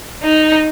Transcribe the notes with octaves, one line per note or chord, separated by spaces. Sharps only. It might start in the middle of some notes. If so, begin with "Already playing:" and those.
D#4